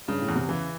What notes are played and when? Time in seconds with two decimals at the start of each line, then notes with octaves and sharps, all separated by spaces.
0.08 G2 C#3
0.21 A2
0.28 E2
0.35 C3
0.48 C#3 E3